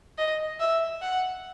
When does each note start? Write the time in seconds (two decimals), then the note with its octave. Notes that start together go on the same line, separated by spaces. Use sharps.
0.18 D#5
0.60 E5
1.02 F#5